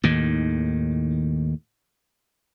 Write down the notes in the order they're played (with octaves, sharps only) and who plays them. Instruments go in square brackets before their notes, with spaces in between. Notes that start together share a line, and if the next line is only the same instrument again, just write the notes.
[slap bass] D#2 A2 D#3